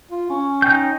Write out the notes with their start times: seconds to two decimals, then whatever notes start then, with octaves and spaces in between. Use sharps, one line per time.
0.11 F4
0.30 C#4
0.62 D#4 G5 G6